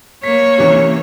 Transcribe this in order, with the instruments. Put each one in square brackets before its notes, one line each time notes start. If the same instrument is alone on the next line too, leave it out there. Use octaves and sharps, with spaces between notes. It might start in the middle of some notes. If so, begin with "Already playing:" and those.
[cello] A#3 C#5 [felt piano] B6
[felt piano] C3 E3 C#4